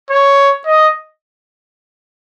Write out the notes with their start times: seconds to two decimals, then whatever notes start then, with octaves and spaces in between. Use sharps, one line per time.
0.10 C#5
0.66 D#5